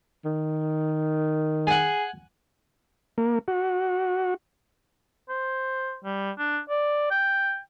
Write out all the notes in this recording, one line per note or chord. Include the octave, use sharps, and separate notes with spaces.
D#3
G#4 F#5 G#5
A#3
F#4
C5
G3
D4
D5
G5